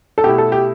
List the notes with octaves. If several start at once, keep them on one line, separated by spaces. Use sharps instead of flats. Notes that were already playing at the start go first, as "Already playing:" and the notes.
A4
B2 A3 E4 G4
A4
G4